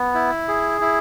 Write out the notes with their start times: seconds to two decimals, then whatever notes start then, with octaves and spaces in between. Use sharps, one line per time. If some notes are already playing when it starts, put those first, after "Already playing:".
Already playing: B3
0.14 E4
0.48 G#4
0.81 E4